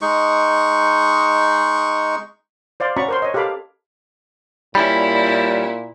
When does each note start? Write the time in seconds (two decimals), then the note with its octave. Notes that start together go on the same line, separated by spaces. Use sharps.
0.01 G#3 D#4 C#6
2.80 C5 D5 F5 C6
2.97 C#4 F#4 D5 A#5 B5 C#6
3.08 A#4 C5 C6
3.22 C#5 D#5
3.34 G4 A4 A#4 F5 B5 D6
4.75 A#2 G3 C#4 E4 B5